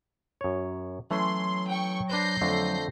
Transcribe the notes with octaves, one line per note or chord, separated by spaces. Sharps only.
F#2 C#5
E3 F#3 A3 C#4 C6
G5 C#6
D4 B4 C5 G6 A#6 C7
F2 D3 A3